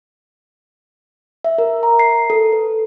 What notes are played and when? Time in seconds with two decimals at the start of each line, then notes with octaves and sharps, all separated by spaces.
1.44 E5
1.58 A#4
1.83 A#5
1.99 C7
2.30 A4
2.52 B4